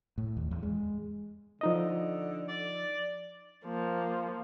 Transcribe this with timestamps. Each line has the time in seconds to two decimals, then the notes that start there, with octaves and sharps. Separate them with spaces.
0.18 A2
0.37 D#2
0.51 E2
0.63 G#3
1.61 D3 F3 D#4 D#5
2.48 D5
3.65 F3 A#3